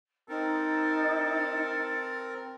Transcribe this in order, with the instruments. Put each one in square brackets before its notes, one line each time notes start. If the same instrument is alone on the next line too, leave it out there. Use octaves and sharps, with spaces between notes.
[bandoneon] C4 A#4 [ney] D#4 [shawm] A4